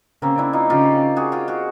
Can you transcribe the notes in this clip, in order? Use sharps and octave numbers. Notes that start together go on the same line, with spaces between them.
C#3 A#3 C4
D4 E4
D#4 F4
C#3 F4 G4
F#4 G#4
F4 G4
F#4 G#4